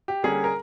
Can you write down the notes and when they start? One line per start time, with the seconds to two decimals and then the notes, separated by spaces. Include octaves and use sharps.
0.08 G4
0.23 D3 G3 A#3 C#4 G#4
0.44 A#4